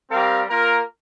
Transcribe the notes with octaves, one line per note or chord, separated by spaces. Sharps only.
G3 C4 G4 A#4 F5
A#3 F4 A#4